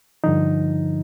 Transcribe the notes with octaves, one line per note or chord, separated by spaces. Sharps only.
G2 D3 F3 D#4